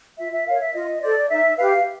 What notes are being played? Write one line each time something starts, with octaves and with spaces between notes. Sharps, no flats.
F4 E5
E5
A#4 C#5 F5
E5
F4 D#5
A4 C5 D5
D#4 E5
G4 B4 F5